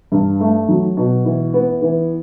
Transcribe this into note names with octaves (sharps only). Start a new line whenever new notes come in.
G2
A3
F#3
B2
E3
B3
E3